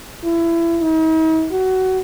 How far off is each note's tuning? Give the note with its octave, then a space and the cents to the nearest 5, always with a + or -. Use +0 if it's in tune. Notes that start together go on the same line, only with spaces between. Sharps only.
E4 +25
D#4 +45
F#4 +20